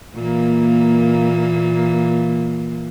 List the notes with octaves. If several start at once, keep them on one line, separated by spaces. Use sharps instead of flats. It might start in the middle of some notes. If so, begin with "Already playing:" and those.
A#2 E3 A#3